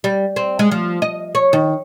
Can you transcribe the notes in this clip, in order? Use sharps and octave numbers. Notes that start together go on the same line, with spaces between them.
G3
C4
G#3
F3
D#5
C#5
D#3